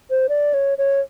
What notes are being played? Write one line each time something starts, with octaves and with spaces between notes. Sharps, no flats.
C5
D5
C#5
C#5